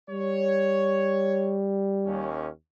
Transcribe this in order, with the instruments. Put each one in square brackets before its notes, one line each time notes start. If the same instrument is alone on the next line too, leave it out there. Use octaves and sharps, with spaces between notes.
[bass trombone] G3 [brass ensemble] C#5
[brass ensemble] D#2 C#4